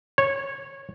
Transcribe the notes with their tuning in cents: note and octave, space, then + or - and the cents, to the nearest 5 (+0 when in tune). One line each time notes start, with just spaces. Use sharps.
C#5 -15